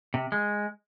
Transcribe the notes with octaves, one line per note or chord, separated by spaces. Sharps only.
C3
G#3